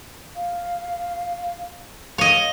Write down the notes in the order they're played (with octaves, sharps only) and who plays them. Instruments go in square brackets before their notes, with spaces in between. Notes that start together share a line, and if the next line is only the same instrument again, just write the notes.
[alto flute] F5
[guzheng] C#5 D#5 [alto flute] F5